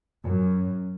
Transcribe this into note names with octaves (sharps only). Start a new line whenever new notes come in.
F#2